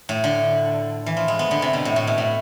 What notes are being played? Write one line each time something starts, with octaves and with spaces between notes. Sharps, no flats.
A2
D3
E3
F3
G#3
B3
D3
C3
B2
A2
A2
B2
A2